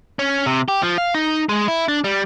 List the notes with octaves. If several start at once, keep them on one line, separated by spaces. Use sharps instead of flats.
C#4
C3
G4
F3
F5
D#4
G#3
E4
D4
G3